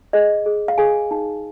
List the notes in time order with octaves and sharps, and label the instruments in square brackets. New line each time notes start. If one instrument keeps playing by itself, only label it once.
[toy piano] G#4 D#5
G#4
F5
G#4 G#5
D#4